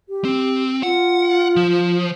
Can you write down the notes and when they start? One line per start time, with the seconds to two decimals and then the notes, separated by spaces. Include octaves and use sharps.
0.09 G4
0.25 C4
0.83 F4 F#5
1.56 F3